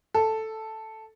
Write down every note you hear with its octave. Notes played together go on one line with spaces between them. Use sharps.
A4